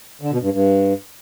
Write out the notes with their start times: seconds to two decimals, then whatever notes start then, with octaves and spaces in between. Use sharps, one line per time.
0.22 D3
0.32 B2
0.42 G2
0.52 G2